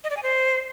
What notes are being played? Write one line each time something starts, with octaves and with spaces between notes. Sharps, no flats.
D#5
D5
G#5
C5